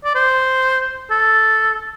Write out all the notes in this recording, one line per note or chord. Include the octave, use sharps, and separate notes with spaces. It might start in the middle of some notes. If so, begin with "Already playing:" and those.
D5
C5
A4